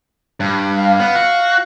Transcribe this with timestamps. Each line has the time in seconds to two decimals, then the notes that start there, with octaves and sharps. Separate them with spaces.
0.40 G2
0.78 F5
1.00 B3
1.15 F#4